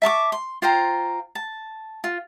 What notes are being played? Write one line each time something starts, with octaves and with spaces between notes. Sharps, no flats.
E5 A5 C#6 D6
C6
F4 C5 G5 A#5
A5
F4